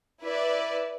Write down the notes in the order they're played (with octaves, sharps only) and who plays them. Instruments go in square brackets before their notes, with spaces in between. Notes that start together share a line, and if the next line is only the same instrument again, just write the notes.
[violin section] E4 B4 D5